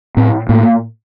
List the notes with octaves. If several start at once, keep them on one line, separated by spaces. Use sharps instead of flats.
A2 C4
A2 A#3